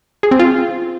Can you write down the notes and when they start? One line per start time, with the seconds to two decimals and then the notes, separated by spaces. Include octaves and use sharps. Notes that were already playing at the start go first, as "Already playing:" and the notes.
0.23 G#4
0.31 C4
0.40 F4